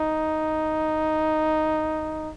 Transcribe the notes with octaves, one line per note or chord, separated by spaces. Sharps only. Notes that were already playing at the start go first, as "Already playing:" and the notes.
Already playing: D#4